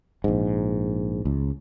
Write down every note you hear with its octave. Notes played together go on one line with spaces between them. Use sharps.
A#1 G#2
C#2